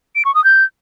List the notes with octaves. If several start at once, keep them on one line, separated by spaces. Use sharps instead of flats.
D7
C#6
D#6
G6